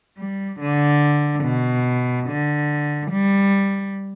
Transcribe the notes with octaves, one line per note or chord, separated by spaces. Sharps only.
G3
D3
B2
D3
G3